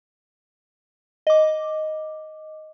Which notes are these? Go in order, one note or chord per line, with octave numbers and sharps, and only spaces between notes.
D#5 D6